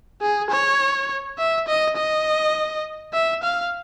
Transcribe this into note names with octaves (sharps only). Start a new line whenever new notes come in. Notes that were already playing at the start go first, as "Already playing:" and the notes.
G#4
C#5
E5
D#5
D#5
E5
F5